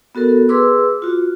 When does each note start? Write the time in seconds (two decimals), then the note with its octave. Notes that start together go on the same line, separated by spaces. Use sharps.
0.15 B3 F#4 A4 A#4
0.49 G#4 B4 C6 D6 E6
1.02 F4 F#4